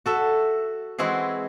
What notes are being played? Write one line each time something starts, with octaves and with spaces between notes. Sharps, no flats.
F#4 A4 E5
E3 G#3 C4 E4 F#4 G#4